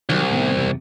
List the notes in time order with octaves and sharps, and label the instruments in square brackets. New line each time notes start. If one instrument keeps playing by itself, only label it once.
[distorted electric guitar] C2 [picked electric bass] D#3 F3 F#3
[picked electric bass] A2 D#3 B3
F#1 E2 C3